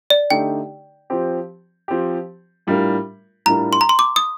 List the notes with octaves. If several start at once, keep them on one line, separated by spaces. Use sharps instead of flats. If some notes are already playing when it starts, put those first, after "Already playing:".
D5
D3 A3 D#4 G4 G5
F3 C4 G4
F3 C4 G4
A2 G3 D4 F4 A#4
A2 G3 D4 F4 A#4 A#5
C6
A#5
C6
D6
D#6